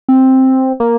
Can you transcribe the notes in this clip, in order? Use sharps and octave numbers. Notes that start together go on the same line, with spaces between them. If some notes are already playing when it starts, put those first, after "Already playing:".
C4
A#3